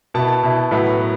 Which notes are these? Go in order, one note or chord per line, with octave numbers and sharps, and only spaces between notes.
B2 B3 E4 A5
B2 B3 E4
A2 F#3 B3 E5
B3